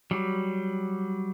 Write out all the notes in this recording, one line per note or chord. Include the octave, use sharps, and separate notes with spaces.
F#3 G3